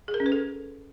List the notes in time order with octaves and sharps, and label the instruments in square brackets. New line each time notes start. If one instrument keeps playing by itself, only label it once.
[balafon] G#4
A#4
C#4
B4
A4